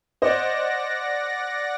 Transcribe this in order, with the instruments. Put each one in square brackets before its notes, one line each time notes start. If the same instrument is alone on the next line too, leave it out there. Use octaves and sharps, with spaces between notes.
[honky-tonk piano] C5 D#5 [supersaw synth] D5 F#5 A#6